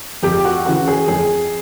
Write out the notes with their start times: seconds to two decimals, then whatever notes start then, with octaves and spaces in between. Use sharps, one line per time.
0.23 F2 G4
0.45 F#4
0.65 C#3 E3 F#4
0.88 G#4
1.08 F2 G#4